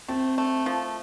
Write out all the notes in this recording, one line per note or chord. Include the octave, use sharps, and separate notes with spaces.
A3 C4
A3
F3